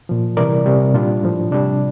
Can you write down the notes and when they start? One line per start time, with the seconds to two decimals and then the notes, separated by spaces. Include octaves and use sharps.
0.09 A#2 F3
0.37 C3 E3 G3 A#4 D5
0.66 C3 G3
0.94 A#2 G3 D4 F4
1.23 A2 F3
1.51 C3 G3 D4